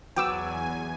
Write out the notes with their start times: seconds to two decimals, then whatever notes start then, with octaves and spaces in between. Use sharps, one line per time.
0.16 E2 F#3 B4 D5 G5 G#5 D6 E6